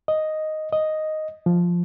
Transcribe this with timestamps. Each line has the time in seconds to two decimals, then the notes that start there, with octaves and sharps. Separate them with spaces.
0.08 D#5
0.73 D#5
1.46 F3